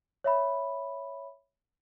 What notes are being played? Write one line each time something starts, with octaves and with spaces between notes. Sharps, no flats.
C#5 E5 B5